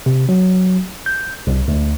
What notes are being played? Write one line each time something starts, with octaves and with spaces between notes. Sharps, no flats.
C3
F#3
G6
C2
D2